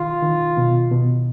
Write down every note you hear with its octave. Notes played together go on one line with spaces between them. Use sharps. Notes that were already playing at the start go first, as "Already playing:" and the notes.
Already playing: D#3 F4
D#3
B2
B2